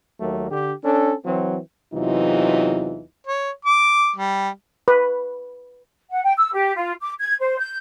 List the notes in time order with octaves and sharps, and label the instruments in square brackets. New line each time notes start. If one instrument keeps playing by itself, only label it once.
[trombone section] D#2 F#3 A3 A#3
D3 G4
C#4 D4 A4
E3 F#3 C4
[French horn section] E2 C3 E3 F#3 D#4 F4
[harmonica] C#5
D6
G3
[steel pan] B4
[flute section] F#5
G5
E6
G4
F4
D6
G#6
C5
G6